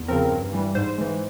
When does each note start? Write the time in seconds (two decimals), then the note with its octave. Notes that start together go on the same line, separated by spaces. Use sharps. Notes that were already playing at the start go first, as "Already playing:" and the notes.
Already playing: E2
0.08 C#3 F3 C4 A#4
0.31 G2
0.53 E3 G3
0.75 G#2 C5
0.98 E3 G#3